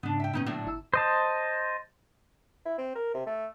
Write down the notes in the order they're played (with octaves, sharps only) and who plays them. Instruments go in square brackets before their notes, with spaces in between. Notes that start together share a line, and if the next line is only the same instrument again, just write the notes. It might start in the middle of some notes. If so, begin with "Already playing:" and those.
[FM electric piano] G#2 C#3 [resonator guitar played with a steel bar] B3 D4
[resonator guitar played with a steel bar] E5 G5
[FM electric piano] A#2 D3 B3 [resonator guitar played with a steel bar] C#4 D#4 E4
[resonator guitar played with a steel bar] A2 F#3 D4
[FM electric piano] G1 E4 E6
[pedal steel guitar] C5 D#5 A5
[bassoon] E4
C4
A#4
C3
A3